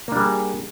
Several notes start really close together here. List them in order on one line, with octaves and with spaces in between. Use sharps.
A#3 D4 G3 G#4